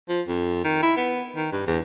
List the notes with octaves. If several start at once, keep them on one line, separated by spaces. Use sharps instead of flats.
F3
F2
D#3
E4
B3
D#3
G2
E2